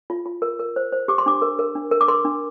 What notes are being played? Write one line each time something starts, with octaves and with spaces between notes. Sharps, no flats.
F4
F4
A#4
A#4
C5
C5
G4 D6
C6
D4 D6
A#4
A#4
D4
A#4
D6
A#4 C6
D4